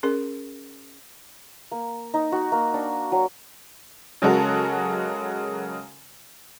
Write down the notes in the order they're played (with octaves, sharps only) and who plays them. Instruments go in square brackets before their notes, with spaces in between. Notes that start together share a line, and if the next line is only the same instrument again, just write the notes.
[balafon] C#4 G#4 A#4
[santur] A#3
D#4
F#4
A#3
D4
F#3
[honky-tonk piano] C#3 F#3 G#3 F#4 A4 A#4